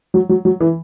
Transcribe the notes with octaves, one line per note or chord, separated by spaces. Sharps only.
F#3
F#3
F#3
E3